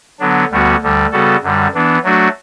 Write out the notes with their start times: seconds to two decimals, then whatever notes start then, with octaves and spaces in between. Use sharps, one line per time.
0.20 D3 F#3 B3 D4
0.51 D2 D3 G3 B3 F#4
0.82 D2 D3 G3
1.12 C#3 G3 B3 F#4 A4
1.43 F#2 D3 G3
1.74 E3 B3 D4
2.04 F#3 A3 D4 F#4